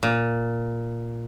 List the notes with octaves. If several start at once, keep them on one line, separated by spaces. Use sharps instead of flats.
A#2